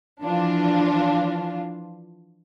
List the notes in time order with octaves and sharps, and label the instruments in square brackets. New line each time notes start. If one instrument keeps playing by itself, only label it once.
[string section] E3 F3 D4 F4